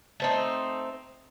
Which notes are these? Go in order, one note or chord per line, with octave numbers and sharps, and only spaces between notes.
A3 C4 D#4